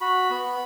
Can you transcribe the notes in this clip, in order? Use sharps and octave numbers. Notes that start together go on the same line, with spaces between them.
F#4 B5
B3